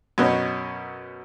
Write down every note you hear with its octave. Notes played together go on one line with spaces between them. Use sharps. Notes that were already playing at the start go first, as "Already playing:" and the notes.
F#2 B2 B3 C#4